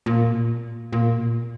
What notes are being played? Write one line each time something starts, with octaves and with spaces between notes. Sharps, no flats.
A#2
A#2